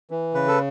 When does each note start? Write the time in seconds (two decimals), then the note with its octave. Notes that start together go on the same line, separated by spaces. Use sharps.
0.11 E3
0.34 C#3 B4
0.48 A4